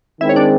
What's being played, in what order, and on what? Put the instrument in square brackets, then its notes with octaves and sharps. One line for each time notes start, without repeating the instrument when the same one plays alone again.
[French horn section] D#3 G#3 C4 [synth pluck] E4 E5
[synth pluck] C#5
D4 D5